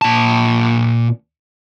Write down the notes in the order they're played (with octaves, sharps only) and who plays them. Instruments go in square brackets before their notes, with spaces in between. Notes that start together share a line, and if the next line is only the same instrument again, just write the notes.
[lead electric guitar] A#2 A5